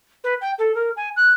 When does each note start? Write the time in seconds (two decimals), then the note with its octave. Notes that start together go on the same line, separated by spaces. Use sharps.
0.24 B4
0.41 G5
0.59 A4
0.75 A#4
0.97 G#5
1.17 F#6